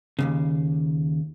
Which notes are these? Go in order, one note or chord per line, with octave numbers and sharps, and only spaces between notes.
D#2 A2 C#3